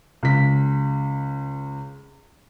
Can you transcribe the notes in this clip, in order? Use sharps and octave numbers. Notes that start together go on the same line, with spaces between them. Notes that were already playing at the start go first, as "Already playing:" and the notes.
C#2 B6